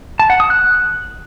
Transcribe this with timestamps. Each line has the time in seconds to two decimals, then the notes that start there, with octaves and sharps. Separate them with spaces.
0.20 A5
0.30 F#5
0.40 D#6
0.50 F#6